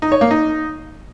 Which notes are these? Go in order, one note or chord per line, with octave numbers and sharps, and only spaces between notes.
D#4
C#5
A#3
D#4